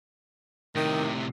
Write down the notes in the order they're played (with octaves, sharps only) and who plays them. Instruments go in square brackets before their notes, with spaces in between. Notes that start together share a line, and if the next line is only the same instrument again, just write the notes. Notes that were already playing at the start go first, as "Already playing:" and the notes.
[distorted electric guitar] A2 C3 [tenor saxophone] D#3